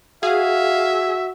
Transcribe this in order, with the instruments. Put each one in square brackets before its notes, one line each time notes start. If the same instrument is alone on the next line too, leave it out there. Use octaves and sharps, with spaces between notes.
[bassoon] F#4 [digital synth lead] G#4 [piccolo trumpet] E5 [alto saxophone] F5